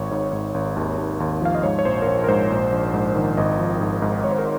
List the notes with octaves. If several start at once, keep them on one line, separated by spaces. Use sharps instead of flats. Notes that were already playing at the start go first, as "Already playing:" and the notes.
Already playing: G#1 C#5
G#2
G#2
G#1
D#2
D#2
D#2
F3 F5
D#5
G#2 C#5
C#5
A#1 C5
A#4
A#1 C5
A#4
G#2 C5
A#1
A#1
G#2
D#3
G#1 D#5
F3
G#2
G#2
G#1 C#5
C5
A#4